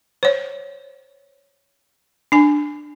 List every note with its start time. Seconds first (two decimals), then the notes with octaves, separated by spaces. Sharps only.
0.23 C5 C#5
2.32 D4 G#5